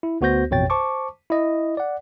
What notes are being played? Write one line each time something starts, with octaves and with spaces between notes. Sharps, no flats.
E4
D2 B3 F#4 C5 G6 A#6
A1 F2 B2 C#5 G5 A6
C5 A5 C#6 D6
E4 D#5
D5 F#5